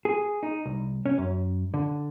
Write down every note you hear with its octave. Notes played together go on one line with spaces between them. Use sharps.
G#4
D#4
C2
C#4
F#2
D3